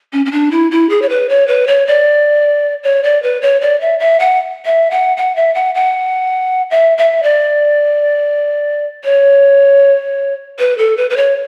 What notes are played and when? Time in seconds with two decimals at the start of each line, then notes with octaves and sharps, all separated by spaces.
0.13 C#4
0.26 C#4
0.32 D4
0.51 E4
0.71 E4
0.89 G#4
1.02 C#5
1.09 B4
1.29 C#5
1.48 B4
1.68 C#5
1.87 D5
2.84 C#5
3.03 D5
3.23 B4
3.42 C#5
3.61 D5
3.81 E5
3.99 E5
4.20 F#5
4.65 E5
4.91 F#5
5.17 F#5
5.36 E5
5.55 F#5
5.75 F#5
6.71 E5
6.98 E5
7.23 D5
9.04 C#5
10.59 B4
10.78 A4
10.97 B4
11.10 B4
11.16 C#5